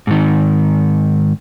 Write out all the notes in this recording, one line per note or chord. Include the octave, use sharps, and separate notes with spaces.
G#2 D#3